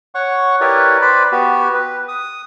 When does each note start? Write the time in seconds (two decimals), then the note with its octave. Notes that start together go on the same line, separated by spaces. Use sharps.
0.15 C#5 F#5 C#6
0.60 E4 G4 A#4 B4 C#5 D5
1.02 B4 C5 D5 B5
1.32 B3 F#4 G4
1.74 B4
2.08 D#6